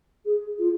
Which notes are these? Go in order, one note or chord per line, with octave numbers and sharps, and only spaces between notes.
G#4
F4